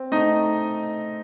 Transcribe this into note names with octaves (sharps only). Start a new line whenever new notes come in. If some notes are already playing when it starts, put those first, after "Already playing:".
Already playing: C4
A3 D#4 D#5